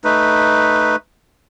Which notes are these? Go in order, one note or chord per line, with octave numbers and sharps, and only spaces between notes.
A3 D#4 B4